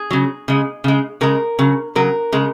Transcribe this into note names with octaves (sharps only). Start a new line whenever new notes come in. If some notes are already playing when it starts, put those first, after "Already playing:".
Already playing: G#4
C#3 F#3
C#3 G#3
C#3 G#3
C#3 G#3 A#4
C#3 F#3
C#3 F#3 A#4
C#3 G#3